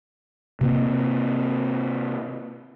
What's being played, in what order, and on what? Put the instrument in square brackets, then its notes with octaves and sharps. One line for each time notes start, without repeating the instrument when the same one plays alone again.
[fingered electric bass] C3 A#3 C4